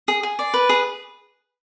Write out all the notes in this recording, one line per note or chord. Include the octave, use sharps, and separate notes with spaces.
G#4
G#4
D5
B4
G#4